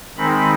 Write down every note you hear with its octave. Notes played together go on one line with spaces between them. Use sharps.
D#3 G#3 C4 D#4 B5